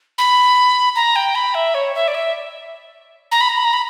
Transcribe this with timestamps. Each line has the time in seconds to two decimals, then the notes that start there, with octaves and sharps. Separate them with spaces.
0.18 B5
0.96 A#5
1.16 G5
1.35 B5
1.54 E5
1.74 C#5
1.95 E5
2.08 D5
2.14 E5
3.32 A#5
3.41 B5
3.49 A#5
3.57 B5
3.65 A#5
3.73 B5